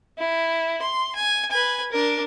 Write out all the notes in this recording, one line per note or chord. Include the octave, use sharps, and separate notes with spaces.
E4
C6
G#5
B4 G#5
D4 A#4